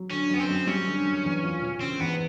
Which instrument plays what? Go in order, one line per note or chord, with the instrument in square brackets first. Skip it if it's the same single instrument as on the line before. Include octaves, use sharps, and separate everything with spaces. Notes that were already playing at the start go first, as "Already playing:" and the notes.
Already playing: [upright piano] F#3
[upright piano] D3 [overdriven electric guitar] C#4
[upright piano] F#2 [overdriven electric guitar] B3
[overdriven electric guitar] C4
[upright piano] F#2
[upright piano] G3 [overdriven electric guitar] C#4
[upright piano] D3
F#2
E2
F3
E1
[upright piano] C#3 [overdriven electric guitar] C4
[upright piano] E2 [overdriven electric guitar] B3